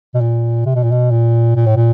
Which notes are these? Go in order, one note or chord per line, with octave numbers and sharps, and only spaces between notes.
B2
A#2
C3
B2
A#2
B2
A#2
A#2
A2
A#2